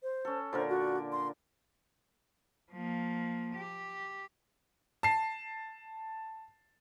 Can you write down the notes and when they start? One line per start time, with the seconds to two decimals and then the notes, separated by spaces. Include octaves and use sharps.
0.03 C5
0.25 C#4 A4
0.53 A#2 D3 A#4 C5
0.69 F#4
1.12 C6
2.72 F3 A#3
3.55 G4
5.03 A5 C7